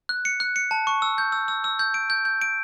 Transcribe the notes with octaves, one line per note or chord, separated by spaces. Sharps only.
F#6
C#7
F#6
C#7
A5
C#6
E6
G6
E6
E6
E6
G6
D7
G6
G6
D7